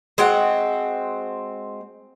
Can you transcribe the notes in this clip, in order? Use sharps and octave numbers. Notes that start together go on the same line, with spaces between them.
G#3 C4 F#4 F#5